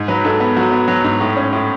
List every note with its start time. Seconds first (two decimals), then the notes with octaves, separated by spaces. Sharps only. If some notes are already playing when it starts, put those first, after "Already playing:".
Already playing: G#2
0.08 F#3 B4
0.24 G#2 A4
0.40 B3
0.57 F#3 F#4
0.72 B3
0.88 F#3
1.04 G#2
1.21 A2
1.36 C#4
1.53 A2